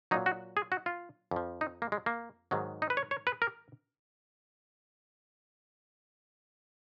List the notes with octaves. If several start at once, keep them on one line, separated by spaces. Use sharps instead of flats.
A#2 F#3 D#4
F#4
G#4
F#4
F4
F2 F3
D#4
A#3
G#3
A#3
G#2 D#3 F#3
D#4
B4
C#5
C#5
B4
A#4